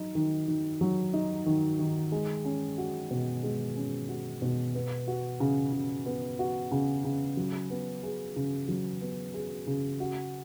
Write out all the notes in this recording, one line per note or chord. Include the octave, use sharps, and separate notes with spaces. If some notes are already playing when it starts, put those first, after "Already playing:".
Already playing: F#3 D#4
D#3
D#3
F#3
D#4
D#3
D#3
G#3
C#4
F#4
B2
G#3
C#4
F#4
B2
B3
F#4
C#3
C#3
B3
F#4
C#3
C#3
F#3
B3
G#4
C#3
F#3
B3
G#4
C#3
F#4